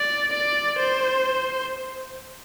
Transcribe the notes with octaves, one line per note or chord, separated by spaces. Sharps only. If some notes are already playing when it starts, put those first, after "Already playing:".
Already playing: D5
D5
C5